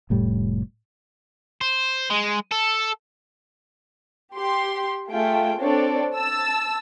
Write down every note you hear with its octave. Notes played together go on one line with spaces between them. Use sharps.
F1 A2 G3
C5
G#3
A4
G4 C6
A3 F4 G#4 G5
C4 D4 A4 C#5 D5
A5 E6